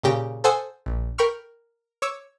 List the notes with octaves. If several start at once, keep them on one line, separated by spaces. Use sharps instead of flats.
A#2 C#3 G4 A#6
A4 C5 F#5 G#5 D#6 E6
A#1
A#4 G5 B5 C#6 F6
C#5 D6 E6